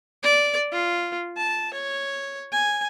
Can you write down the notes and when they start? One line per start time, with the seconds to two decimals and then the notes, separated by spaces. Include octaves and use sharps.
0.23 D5
0.72 F4
1.37 A5
1.74 C#5
2.53 G#5